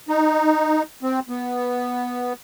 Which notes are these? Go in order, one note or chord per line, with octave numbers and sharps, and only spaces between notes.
D#4
C4
B3